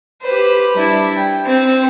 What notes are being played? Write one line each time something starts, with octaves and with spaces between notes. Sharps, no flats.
G4 B4 C5
G3 D4 E4
G5
C4